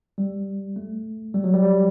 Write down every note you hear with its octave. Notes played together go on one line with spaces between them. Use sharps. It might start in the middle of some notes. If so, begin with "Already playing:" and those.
G3
A3
G3
F#3
G3
G3